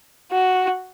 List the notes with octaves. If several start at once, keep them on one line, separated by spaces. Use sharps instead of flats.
F#4